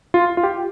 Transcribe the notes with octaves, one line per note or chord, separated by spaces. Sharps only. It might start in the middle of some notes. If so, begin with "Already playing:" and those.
F4
F4
G4